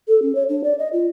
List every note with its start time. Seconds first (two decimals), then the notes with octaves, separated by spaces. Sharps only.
0.08 A4
0.22 C#4
0.35 C#5
0.49 D4
0.64 D5
0.79 D#5
0.93 F4